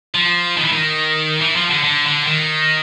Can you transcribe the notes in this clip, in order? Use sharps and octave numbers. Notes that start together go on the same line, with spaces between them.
F3
D#3
E3
D#3
E3
F3
D3
D3
D3
D#3